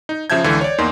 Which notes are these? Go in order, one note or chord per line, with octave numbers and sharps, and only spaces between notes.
D#4
C#3 F3 E5 A5 G6 G#6
C#2 D3 E3
C#5 D5
E2 A#3 D#4 C6